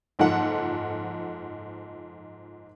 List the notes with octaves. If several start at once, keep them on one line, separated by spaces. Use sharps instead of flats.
F#1 G#2 F3 A4 F#5